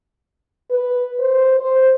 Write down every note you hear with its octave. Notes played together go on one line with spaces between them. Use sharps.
B4
C5
C5